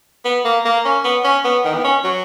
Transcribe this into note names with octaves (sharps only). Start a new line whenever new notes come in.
B3
A#3
A#3
C#4
B3
C#4
B3
D#3
B3
C#4
F#3